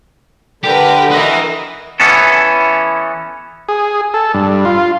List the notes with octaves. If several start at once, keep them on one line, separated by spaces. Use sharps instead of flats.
D3 G4 A#4 B4
A#4 B4 D#5 E5 A#5
E3 B3 C#4 A4
G#4
A4
G2
F4